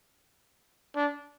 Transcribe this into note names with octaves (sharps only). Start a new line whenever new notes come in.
D4